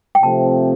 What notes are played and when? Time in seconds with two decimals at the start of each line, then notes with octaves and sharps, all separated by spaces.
0.15 G5
0.23 C3 F3 A3 C4 A5